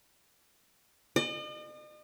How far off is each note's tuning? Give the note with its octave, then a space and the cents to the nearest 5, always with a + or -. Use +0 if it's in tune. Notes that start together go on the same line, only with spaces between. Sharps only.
D#5 -45